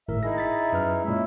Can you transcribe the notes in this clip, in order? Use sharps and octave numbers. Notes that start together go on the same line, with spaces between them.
G#1 A2 A#4 E5
D#4 E4 G#4 A#6
E5 A6 B6
F#2 B4 F6
A#2 G#3 C#4 E4 E5